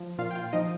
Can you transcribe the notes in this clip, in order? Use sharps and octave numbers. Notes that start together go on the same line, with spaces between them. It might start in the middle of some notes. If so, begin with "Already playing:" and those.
Already playing: F3
A#2 F4 F5
G5
F4 F5
F3 D#4 D#5